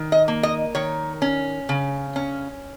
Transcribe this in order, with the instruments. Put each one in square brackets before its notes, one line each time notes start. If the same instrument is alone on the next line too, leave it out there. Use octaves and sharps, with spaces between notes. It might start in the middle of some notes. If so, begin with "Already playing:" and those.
Already playing: [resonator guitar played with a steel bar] D#3
D#5
A#3
D#5
D#3 C#5
C#4
C#3
C#4